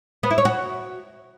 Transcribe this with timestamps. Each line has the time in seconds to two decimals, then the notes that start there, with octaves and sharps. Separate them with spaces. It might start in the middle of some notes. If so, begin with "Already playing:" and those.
0.23 B3
0.31 E4
0.38 C#5
0.45 F#4